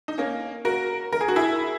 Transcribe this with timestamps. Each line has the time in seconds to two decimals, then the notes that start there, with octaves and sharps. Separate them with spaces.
0.08 D#4
0.18 A#3 C#4
0.65 F#4 A#4
1.13 A#4
1.21 G#4
1.28 F#4
1.36 E4 G#4